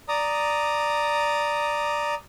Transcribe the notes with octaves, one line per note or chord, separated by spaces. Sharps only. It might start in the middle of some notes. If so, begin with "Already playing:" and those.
D5 A#5 D#6